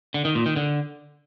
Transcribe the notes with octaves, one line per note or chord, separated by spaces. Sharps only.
D3
D#3
A#2
D#3
D3